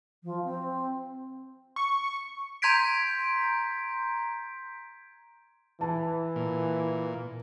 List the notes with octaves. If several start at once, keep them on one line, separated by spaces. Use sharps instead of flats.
F3
C4
C#6
A#5 C6 G6 G#6 B6 D7
E3 A5
A#2